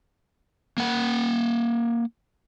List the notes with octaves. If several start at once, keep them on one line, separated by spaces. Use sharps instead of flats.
A#3 F#5